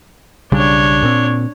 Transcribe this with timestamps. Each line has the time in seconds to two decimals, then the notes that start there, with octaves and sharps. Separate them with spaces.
0.52 B1 C#3 G3 D4 C#5
1.03 A#2 C4